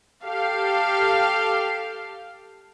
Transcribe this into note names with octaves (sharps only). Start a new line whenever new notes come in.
G4 A4 F5